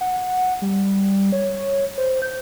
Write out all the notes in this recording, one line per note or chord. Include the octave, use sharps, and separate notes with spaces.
F#5
G3
C#5
C5
G6